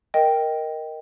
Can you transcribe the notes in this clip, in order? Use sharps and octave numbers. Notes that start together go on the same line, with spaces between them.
A#4 D#5 G5